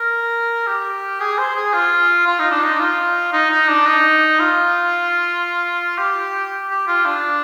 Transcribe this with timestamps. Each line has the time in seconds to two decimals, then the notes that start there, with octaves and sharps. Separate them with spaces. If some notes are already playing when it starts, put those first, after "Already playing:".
Already playing: A#4
0.67 G4
1.20 G#4
1.38 C5
1.56 G#4
1.73 F4
2.26 F4
2.39 D#4
2.51 D4
2.63 D#4
2.79 F4
3.33 D#4
3.51 D#4
3.68 D4
3.86 D#4
4.39 F4
5.98 G4
6.70 G4
6.87 F4
7.05 D4